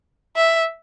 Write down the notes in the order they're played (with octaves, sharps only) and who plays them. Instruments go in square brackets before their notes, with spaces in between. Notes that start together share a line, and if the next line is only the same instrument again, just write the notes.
[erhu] E5